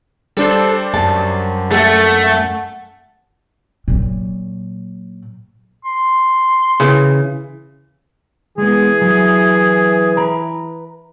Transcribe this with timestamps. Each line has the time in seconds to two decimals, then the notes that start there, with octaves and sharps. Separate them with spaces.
0.37 G3 D4 A4 C5
0.94 F#2 A5
1.71 A3 A4 F#5
3.88 A#2 F#3
5.85 C6
6.80 C#3 E3
8.58 E3 G#3 B3 G#4
9.01 F#3
10.16 B4 A#5 B5